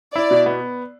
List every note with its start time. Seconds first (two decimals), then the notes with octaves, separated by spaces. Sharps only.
0.15 E4 D5
0.31 B2
0.46 B3